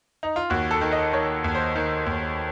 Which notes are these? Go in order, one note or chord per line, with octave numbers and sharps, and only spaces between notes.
D#4
F4
D#2 F#4
A4
D#3
D#5
D#3 C#5
D#2
C5
D#3
D#2